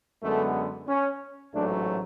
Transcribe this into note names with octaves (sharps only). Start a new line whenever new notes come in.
F#2 D3 G#3 A3 B3 A4
C#4
A1 G#2 F#3 A3 D4